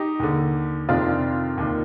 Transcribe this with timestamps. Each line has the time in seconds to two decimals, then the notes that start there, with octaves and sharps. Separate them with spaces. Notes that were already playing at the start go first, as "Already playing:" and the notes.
Already playing: D#4 G4
0.19 D#2 D3
0.89 F2 C3 D#3 D4 F4
1.58 D#2 D#3